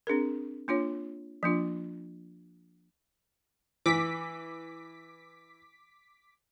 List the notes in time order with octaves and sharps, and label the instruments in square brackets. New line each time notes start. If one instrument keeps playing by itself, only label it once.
[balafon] C4 D4 G#4 A#4
A#3 D4 F4 C#5
F3 A#3 D4 F4
[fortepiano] E3 [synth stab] D6 B6